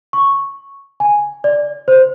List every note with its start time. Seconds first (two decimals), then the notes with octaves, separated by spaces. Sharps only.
0.13 C#6
1.00 G#5
1.44 D5
1.88 C5